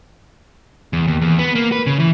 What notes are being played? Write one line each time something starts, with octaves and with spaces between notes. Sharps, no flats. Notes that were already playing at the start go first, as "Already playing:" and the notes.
E2
D#2
E2
B3
A#3
B4
C#3
E3